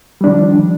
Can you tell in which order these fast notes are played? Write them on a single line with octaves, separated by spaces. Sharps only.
G3 D4 D#3 F3